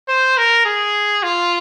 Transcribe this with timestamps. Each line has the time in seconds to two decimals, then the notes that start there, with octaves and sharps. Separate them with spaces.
0.08 C5
0.37 A#4
0.65 G#4
1.23 F4